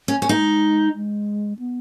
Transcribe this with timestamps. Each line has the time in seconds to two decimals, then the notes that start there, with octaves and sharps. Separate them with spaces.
0.08 C#4
0.22 C#4
0.29 G#3 D#4
0.95 G#3
1.59 B3